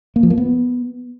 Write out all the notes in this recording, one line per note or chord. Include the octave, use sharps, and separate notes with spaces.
A#3
F3
A#3
B3